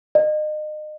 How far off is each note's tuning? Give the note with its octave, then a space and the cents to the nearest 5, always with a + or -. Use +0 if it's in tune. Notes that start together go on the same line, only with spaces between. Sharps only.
D#5 -35